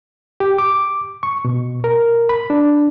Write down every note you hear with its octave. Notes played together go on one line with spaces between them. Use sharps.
G4
D6
C#6
B2
A#4
B5
D4